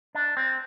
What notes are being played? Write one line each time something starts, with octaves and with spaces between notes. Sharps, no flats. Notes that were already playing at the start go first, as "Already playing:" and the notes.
D4
C4